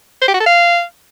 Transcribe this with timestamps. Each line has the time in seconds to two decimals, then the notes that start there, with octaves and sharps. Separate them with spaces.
0.22 C5
0.28 G4
0.34 F#4
0.40 A4
0.46 F5